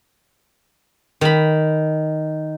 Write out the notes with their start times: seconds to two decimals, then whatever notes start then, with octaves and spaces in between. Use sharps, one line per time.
1.21 D#3 B5